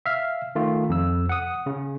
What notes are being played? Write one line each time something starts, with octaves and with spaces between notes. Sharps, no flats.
E5 F5 F6
D#3 A3 F4
F2 E6
F#5 D#6
C#3